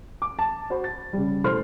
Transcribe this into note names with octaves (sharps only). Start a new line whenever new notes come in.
D6
A5
F#4 C5 B5
A6
C#3 G3
E1 E3 A3 C5 C6 F6